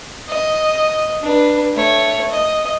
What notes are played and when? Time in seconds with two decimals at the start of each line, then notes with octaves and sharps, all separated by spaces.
0.29 D#5
1.22 D4 B4
1.75 A3 C#5
2.31 D#5